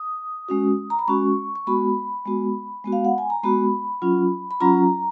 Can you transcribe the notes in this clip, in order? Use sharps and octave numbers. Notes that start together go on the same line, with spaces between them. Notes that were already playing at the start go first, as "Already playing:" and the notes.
Already playing: D#6
G#3 C#4 F#4
A#5
B5
G#3 C#4 F#4 C#6
C#6
G#3 B3 F#4 B5
G#3 B3 F#4
G#3 B3 F#4
F5
F#5
G#5
A#5
G#3 B3 F#4 B5
F#3 C#4 F4
B5
F#3 C#4 F4 A#5